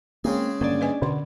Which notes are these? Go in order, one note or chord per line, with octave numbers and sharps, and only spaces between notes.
C#3 G#3 A#3 C4 G#4
G2 D3 A#3 C#4 D4 D5
B4 D#5 G#5
B2 D3 B3 C6